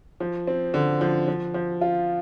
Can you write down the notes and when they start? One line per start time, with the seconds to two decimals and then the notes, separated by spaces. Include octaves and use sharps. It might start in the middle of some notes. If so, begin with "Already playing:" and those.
0.20 F3
0.47 C4
0.74 D3
1.01 F3
1.28 F3
1.54 F3
1.81 F4